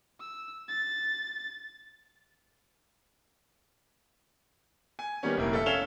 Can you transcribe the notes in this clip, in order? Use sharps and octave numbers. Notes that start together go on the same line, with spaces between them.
E6
A6
G#5
D#3 G3 A#3 B3 C#4
F1 A#1 E4 A#4
A4 E5
C#4 F5 E7 F7 G7